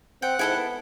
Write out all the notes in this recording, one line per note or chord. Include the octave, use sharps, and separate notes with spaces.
C4 F#5 G5
G#2 E4 G#4 A4
B3